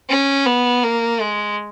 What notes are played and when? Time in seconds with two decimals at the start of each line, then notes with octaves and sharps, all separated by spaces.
0.10 C#4
0.46 B3
0.84 A#3
1.21 G#3